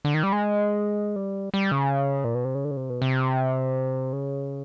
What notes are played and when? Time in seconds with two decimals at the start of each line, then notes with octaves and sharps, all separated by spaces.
0.05 D3
0.14 D#3
0.23 G3
0.32 G#3
1.16 G3
1.54 G3
1.72 C#3
2.24 A#2
2.35 B2
2.45 C3
2.55 C#3
2.65 D3
2.71 C#3
2.77 C3
2.90 B2
3.02 C3
4.13 C#3